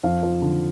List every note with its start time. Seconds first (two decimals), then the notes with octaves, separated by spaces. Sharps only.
0.03 F2 F5
0.23 F3
0.42 D3